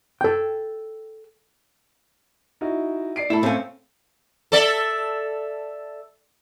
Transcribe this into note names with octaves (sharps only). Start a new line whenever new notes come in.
A4 G5
D#4 E4 F#4
D5 C7 D7
A2 E4 A4 B5
A2 C4 C#4 A4 F5
A4 D5 E5